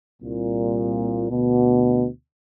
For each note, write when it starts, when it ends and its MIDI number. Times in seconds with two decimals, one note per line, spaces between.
0.22 1.27 36
0.22 1.27 46
1.29 2.05 38
1.29 2.05 47